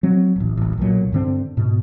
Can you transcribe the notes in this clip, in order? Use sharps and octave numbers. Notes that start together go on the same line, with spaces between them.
F#3 C4
D1 A1
D#1 A1
B1 A#2 F#3
G2 D3 C4
G#2 B2